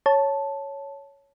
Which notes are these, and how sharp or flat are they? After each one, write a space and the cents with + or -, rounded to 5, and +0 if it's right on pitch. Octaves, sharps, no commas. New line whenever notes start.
C#5 +0 A5 -5